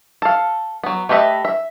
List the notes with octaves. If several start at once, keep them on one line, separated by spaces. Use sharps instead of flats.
A4 F5
F#3 B3
A3 G4 B4 D#5 E5
E5